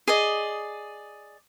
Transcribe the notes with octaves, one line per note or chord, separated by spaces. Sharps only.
G#4 D5 D#5